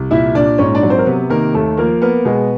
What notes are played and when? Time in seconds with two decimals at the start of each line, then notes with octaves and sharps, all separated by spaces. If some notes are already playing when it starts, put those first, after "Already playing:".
Already playing: C2
0.11 A#2 E4 E5
0.35 A#2 D4 D5
0.58 G#2 C#4 C#5
0.75 D4 D5
0.82 F#3
0.90 C4 C5
0.99 A#4
1.06 C3 B3 B4
1.30 D#3 A#3 A#4
1.54 D#2 A3 A4
1.77 F3 A#3 A#4
2.02 A#3 B3 A#4
2.25 B2 G#3 G#4